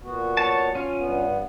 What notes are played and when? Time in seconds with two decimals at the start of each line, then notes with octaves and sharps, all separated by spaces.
0.02 A#2 B3 F#4
0.37 C#5 A5
0.75 C#4 F4
0.98 G2 B3